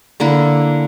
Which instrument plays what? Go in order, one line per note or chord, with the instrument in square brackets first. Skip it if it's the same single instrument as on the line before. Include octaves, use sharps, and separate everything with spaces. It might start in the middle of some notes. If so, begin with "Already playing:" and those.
[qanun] D3 A#3 D4 E4